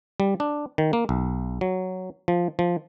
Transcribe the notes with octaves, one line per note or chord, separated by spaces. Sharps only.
G3
D4
D#3
A#3
B1
F#3
F3
F3